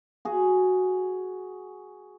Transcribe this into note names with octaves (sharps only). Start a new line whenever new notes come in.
F#4 G#4